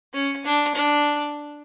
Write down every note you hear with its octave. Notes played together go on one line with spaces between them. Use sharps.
C#4
D4
D4